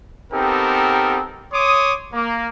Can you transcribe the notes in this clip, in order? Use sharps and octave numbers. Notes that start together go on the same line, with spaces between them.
B3 C4 D#4 G4 A4 A#4
C#5 C6 D6 D#6
A#3